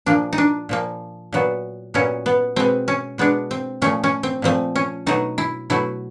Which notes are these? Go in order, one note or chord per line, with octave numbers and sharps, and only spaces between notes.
A#2 F3 A#3 D4
D#4
D4
A#2 F3 A#3
A#2 F#3 B3
A#2 F#3 B3 C#4
B3
B2 G#3 B3 C4
C#4
B2 G#3 B3 D4
C4
A#2 F3 A3 C#4
C#4
C4
A#2 F3 A3 C4
C#4
B2 F#3 A3 D#4
E4
B2 F#3 A3 E4